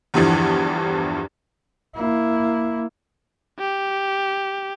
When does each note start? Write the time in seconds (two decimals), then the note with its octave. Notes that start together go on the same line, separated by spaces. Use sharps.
0.14 E2 G2 D3 E3 F3
1.95 A#3 E4
3.59 G4